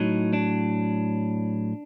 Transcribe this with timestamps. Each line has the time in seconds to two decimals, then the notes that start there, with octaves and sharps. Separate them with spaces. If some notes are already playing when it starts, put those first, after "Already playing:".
Already playing: A2 F#3 D#4
0.33 D4